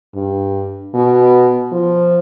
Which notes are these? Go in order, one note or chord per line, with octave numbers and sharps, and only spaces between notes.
G2
B2
F3